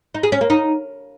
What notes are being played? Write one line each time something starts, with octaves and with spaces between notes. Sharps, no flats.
D#4
G#4
C#4
A#3
D#4